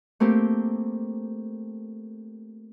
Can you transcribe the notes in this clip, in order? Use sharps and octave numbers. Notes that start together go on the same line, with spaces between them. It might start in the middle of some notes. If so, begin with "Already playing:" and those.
A3 A#3 C4 G4